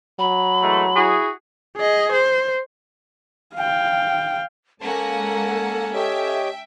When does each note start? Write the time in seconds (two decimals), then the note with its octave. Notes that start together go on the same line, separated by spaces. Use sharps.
0.19 F#3 B5
0.62 E3 G#3 A3
0.96 E4 F#4 G#4
1.77 G#4 D#5
2.12 C5
3.55 F5 G5
4.81 G#3 A#3 C#4 A4 F#5 A5
5.95 G4 C#5 D#5 E5 G5